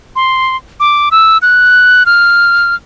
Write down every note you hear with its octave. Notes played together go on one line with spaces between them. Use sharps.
C6
D6
E6
F#6
F6